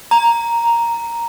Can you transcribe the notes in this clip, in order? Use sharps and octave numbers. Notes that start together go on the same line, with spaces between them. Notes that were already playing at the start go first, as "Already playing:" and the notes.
A#5